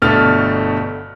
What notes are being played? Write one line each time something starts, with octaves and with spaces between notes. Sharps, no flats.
G1 B2 D3 A3 F6 A6